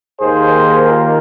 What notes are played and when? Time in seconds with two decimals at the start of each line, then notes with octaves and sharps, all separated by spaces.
0.20 D#2 D#3 A#3 G#4 C5
0.87 F4 A#4